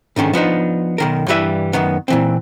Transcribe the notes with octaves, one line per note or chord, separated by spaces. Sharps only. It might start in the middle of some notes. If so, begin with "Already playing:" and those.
G#2 D3 D#3 C#4
F3 B3 D4 D#4
B1 D#3 A#4
G2 E3 G3 B4 E5
F#2 D#3 B3
A#2 E3 C4